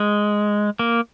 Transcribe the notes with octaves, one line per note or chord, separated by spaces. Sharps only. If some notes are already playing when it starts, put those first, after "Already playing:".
Already playing: G#3
A#3